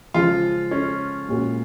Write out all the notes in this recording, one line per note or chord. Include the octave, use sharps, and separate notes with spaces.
C#3 F3 G#3 F4
C#4
A#2 G#3 C#4 F#4 A#4